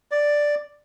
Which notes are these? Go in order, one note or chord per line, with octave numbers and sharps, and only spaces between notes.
D5